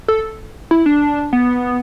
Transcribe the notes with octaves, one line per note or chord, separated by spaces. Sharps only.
A4
E4
D4
B3